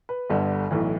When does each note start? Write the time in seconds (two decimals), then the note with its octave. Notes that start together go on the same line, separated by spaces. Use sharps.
0.09 B4
0.30 G1 G2 D3
0.71 B1 A2 E3